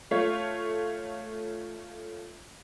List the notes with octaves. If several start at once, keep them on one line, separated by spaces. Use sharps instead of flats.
A3 F4 C#5